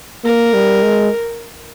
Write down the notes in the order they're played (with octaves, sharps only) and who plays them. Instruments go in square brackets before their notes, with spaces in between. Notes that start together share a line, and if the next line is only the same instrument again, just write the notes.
[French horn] A#3 [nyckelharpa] A#4
[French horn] G3
G#3